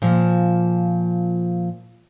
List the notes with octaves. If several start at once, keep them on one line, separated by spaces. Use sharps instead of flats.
A#2 F3